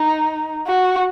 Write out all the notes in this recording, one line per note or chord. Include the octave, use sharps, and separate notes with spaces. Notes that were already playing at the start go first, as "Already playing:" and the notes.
Already playing: D#4
F#4